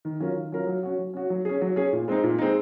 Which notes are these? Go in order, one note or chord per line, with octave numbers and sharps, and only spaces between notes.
D#3
F#3 C#4 F4 A#4
D#3
F#3 C#4 F4 A#4
F#3
C#4 F#4
F#3
C#4 F#4
F#3
C#4 G#4
F#3
C#4 G#4
A#2
G#3 C4 D#4
A#2
G#3 C4 D#4